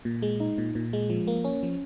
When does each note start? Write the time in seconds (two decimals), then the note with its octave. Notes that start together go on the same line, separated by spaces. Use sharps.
0.05 A#2
0.22 G#3
0.40 D#4
0.58 A#2
0.75 A#2
0.93 G#3
1.10 F3
1.27 A#3
1.44 C#4
1.63 F3